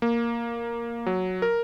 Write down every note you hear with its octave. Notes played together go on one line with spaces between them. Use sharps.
A#3
F#3
A#4